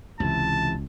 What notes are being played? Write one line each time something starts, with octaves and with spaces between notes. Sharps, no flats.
C#2 C3 E3 A5